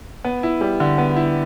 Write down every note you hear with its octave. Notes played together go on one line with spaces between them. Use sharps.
B3
E4
G3
D3
B3
E4